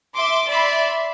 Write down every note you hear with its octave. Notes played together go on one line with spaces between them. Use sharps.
E5 C6 D6
D5 E5 B5 C6